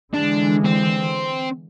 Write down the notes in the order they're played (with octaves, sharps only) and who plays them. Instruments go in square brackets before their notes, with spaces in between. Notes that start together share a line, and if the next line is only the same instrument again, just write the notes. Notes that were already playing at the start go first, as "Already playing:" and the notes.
[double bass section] D3 E3 G#3 [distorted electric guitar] D4
[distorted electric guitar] C4